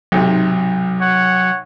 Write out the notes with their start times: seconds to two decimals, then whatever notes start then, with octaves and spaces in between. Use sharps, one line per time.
0.12 B1 G#2 C3 F#3
1.00 C#5 F#5